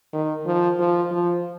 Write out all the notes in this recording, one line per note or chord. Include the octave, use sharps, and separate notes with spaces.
D#3
F3
F3
F3